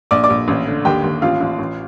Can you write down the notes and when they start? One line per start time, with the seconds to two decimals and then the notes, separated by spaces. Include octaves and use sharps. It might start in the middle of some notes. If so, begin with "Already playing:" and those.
0.11 A#1 D5 D6
0.23 D5 D6
0.30 A#1
0.48 A1
0.67 D3
0.85 D#2 G4 G5
1.04 D#2
1.22 A1 F4 F5
1.40 A1
1.59 A1